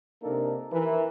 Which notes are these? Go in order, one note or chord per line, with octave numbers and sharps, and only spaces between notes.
C3 A#3 D4 D#4 A4 A#4
E3 A#4